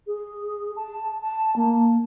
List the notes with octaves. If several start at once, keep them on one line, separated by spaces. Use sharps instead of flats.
G#4
A5
A5
A#3